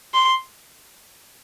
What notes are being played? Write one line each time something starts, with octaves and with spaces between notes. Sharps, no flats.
C6